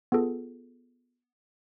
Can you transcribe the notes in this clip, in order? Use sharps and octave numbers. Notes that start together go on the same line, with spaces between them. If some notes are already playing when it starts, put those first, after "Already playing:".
B3 F4 G#4 A4